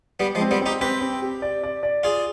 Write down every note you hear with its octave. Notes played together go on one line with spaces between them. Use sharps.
G3 B3 G4
F3 G#3
C4
G3 B3
C4 D#4 G4
C4 G4 B4
C4
G4
D5
D5
D5
F4 G#4 D5